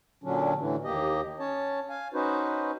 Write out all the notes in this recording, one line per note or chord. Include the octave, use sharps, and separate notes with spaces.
A#2 D3 F#3 C#4 D4
A2 D3 E3
D#2 A#3 G4 D#5
C#4 C#5 A5
F5 G#5
C#4 D#4 F#4 B4 C5